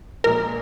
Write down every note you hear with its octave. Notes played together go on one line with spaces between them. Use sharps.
A#1 A#2 G#3 A#4